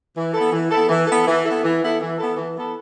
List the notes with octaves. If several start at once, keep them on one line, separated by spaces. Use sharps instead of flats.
E3
B3 E4 A4
E3
B3 E4 A4
E3
B3 E4 A4
E3
B3 E4 A4
E3
B3 E4 A4
E3
B3 E4 A4
E3
B3 E4 A4